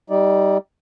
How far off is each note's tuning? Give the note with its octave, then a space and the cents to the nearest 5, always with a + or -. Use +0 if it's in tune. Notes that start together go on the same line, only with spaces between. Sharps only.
G3 +0 D#4 +25 D5 +0